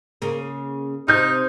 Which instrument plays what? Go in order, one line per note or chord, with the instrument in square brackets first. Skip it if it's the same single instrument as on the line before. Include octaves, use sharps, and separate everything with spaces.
[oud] C#3 A#3
[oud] C3 [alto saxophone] D#4 [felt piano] F6 G6